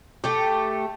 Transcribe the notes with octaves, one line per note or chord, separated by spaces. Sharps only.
A3 G4